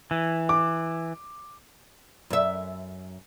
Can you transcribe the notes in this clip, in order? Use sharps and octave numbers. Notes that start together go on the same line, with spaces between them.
E3
D6
F#2 E5